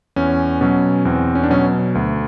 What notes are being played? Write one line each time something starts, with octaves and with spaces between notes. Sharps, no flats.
E2 C#4
B2 F#3 C#4
E2 C4
C#4
D4
B2 F#3 C#4
D2